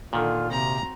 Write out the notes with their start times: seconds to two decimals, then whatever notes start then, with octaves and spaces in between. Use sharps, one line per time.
0.13 A#2 D3 D#3 F4
0.51 C3 C4 F#4 A#5